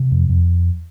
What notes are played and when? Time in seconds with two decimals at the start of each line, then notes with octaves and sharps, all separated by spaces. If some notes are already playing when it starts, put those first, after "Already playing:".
Already playing: C3
0.11 F2
0.29 F2